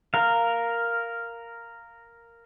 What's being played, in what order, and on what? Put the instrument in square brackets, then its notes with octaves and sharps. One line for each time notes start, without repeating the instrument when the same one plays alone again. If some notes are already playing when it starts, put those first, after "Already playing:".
[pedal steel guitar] A#4 F5